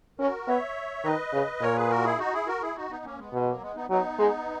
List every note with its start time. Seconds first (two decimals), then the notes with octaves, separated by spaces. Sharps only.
0.19 C#4 F#4 A#4
0.48 B3 C#5 E5
1.05 D#3 B4 D#5
1.33 C#3
1.61 A#2 A#4 C#5
1.76 G#4 B4
1.90 F#4 A#4
2.04 E4 G#4
2.19 D#4 F#4
2.33 E4 G#4
2.47 F#4 A#4
2.61 E4 G#4
2.76 D#4 F#4
2.90 B3 D#4
3.05 A#3 C#4
3.18 G#3 B3
3.33 B2 G#3
3.47 F#3 A#3
3.61 G#3 B3
3.76 B3 D#4
3.90 F#3 B3 D#4
4.19 G#3